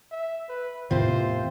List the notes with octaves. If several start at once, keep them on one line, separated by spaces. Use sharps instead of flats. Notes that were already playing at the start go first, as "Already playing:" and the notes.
E5
B4
E2 A2 C3 D#3 F4 C5